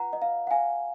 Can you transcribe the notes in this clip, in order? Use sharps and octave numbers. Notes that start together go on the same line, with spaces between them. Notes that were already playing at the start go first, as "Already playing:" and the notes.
Already playing: F4 B4 F#5 A#5
D#5
F5
F#5
F5 G#5